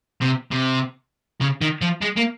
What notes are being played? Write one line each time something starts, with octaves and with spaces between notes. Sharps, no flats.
C3
C3
C#3
D#3
F3
G#3
A#3